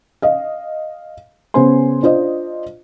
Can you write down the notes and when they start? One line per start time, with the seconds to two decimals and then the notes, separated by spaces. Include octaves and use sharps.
0.22 D#5 F5
1.54 C#3 B3 C#4 C5 G#5 C6
2.03 D4 F4 C5 D#5